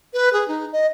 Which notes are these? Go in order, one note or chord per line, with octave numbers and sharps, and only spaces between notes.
B4
G#4
D#4
D#5